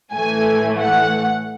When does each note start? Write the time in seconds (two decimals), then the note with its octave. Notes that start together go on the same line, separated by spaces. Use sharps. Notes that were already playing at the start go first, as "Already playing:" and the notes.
0.13 A2 E3 A3 G#5
0.79 F#5